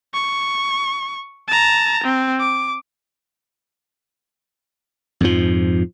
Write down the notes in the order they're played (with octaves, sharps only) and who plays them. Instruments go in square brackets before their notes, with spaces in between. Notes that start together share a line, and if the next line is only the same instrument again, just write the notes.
[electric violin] C#6
A5 A#5
C4
D6
[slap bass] F2 G#2 F3